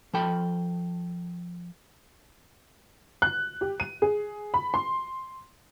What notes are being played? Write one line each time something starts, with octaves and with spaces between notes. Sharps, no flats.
F3 A4 G5 B5
F#6
G4
D#7
G#4
B5
C6